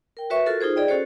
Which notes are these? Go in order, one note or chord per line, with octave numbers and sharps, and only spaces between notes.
A#4 G5
F#4 B4 C#5 E5 C#6
F4 F#4 A4 A#4
D#4 F4 G#4 C5
G#4 D5 D#5 G5
C#4 F#4 A4 C5 C#5